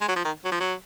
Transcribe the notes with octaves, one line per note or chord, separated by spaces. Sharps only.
G#3
F#3
F3
D#3
F#3
F3
F#3